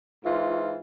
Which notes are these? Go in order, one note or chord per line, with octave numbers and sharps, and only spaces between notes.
G#2 E3 F4